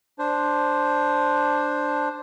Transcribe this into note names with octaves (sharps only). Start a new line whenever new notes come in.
D4 C5